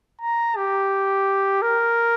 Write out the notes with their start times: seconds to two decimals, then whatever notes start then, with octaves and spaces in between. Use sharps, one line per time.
0.22 A#5
0.57 G4
1.62 A#4